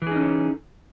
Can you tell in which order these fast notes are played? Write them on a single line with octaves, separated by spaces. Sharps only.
E3 G#4 D#4 C#4 A4